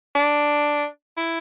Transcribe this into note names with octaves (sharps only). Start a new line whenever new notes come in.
D4
E4